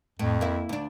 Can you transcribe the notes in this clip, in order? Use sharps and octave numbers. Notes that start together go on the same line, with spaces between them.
F2 A2
A#3 E4
D2 D4